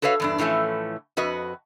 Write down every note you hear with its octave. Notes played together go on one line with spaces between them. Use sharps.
F#4 A4 B4 C#5 F5
E2 G2 D4
A2 E3 F3 A3 C#4
F2 F#4 B4 D#5